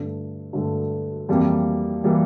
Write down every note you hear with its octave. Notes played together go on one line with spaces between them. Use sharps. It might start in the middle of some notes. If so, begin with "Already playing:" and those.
Already playing: G2 D3 A3
G2 D3 A3
F2 E3 G3 A#3
E3 G3 A#3